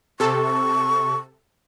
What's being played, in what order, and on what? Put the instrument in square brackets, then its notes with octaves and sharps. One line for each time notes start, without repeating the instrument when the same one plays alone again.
[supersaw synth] C3 A4 [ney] C#6